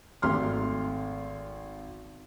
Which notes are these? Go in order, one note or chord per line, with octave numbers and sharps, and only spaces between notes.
G#1 A3 C6 F6